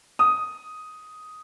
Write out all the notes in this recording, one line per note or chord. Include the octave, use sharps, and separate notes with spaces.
D#6